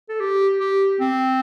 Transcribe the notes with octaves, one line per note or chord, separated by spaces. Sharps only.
A4
G4
G4
C4